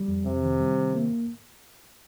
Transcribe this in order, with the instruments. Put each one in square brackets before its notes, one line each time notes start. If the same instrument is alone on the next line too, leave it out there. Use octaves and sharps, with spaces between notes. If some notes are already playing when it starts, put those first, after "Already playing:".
Already playing: [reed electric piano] G3
F2
[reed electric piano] F2 [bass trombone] C3
[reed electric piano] D#3
G3
D#3
A#3